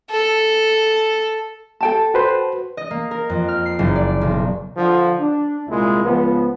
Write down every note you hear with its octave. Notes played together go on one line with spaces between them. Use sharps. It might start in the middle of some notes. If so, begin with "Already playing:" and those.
A4
A4 G5 A5
F#4 B4 C5
D#5
A#3
A#4
F2
F6
C7
F#1
D5
B1
D3 F3
D4
C2 A#2 G#3 E4
C#2 F3 B3